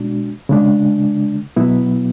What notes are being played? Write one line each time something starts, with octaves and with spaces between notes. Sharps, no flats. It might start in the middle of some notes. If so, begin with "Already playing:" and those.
Already playing: B2 G#3 D4 F#4
C#3 G#3 D4
B2 F#3 B3 E4